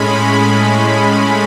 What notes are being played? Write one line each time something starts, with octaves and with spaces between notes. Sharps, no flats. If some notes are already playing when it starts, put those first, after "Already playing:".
Already playing: A2 G#3 C#4 B5
B5